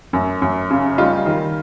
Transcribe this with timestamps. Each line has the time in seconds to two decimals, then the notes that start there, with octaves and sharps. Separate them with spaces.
0.13 F#2
0.42 F#2
0.71 C#3
0.98 G3 D#4 F4
1.26 D#3